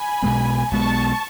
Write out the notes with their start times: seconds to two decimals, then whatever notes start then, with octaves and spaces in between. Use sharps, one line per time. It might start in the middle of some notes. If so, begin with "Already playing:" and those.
Already playing: G#5 B5
0.22 B1 B2 G#3 B3
0.71 B1 B2 G#3 B3 A5 C#6